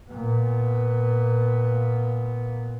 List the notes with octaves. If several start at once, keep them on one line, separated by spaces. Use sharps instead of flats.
A#2 B3